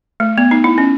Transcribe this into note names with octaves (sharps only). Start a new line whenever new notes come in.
A3
B3
D#4
E4
C#4